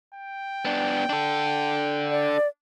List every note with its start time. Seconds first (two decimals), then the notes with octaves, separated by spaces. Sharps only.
0.15 G5
0.65 B3 D4
1.09 D4 A4
2.10 D5